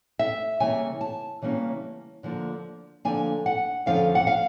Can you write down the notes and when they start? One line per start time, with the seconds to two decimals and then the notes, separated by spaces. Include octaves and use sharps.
0.19 E5
0.60 C#3 E3 G3 A#3 C#4 G#5
1.01 A5
1.42 C#3 E3 G3 A#3 C#4
2.23 D3 F3 A#3 D4
3.05 D3 F3 A#3 D4 G#5
3.46 F#5
3.86 F2 D3 F3 C#4 F5
4.15 F#5
4.27 F5